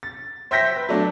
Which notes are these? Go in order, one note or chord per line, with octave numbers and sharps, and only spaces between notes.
A6
C5 E5 G5 G6 A#6 B6
B4
F#3 A3 D4